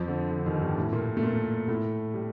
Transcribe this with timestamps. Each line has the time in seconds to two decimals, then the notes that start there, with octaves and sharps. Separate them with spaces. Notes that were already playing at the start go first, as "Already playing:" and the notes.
Already playing: F2 F3
0.08 D3
0.31 D3
0.46 D#2 D#3
0.62 G2 G3
0.77 A2 A3
0.92 A#2 A#3
1.17 A3
1.23 A#2 A#3
1.68 A2 A3
2.14 G3